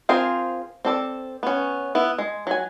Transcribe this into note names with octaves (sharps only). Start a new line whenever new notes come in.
C4 F4 G#4 A#4 C5
C4 A4 D5
B3 C#4
B3 E4
G#3
F#3 G#5